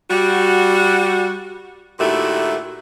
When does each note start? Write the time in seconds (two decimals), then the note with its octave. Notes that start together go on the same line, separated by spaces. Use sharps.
0.10 G3 F#4
1.99 A#2 D#3 A3 E4 F#4 G4